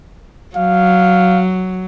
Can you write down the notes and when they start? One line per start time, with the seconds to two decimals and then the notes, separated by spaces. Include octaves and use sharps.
0.56 F#3 F5